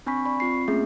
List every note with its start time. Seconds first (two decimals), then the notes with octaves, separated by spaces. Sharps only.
0.06 C4 D4 G#5 B5 C#6 B6
0.25 D5 B5 C#6
0.40 C4 F4 C7
0.68 A3 A#3 C4 C#4 G#4 E5